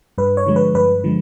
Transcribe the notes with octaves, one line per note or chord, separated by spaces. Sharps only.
G2 B4
C#5
D3 F3 G#3
B4
G2 B4
D3 F3 G#3